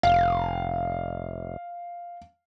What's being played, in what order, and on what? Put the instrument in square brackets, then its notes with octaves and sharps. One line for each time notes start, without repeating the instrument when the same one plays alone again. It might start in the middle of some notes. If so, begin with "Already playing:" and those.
[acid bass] F1 [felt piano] F5